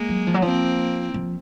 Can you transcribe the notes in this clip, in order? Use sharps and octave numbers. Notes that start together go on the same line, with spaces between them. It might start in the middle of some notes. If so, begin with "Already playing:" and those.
Already playing: G#3 A#3
F#3
F3
F#3
F3 A#3 C4
F3